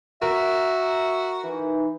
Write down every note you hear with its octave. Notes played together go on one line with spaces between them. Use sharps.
F#4 A#4 E5
E3 D#4